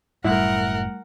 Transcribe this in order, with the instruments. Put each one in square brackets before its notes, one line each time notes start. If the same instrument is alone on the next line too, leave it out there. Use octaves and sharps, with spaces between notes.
[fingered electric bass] F#1 A2 [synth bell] G3 A3 [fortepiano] E4 [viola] A#4 F#5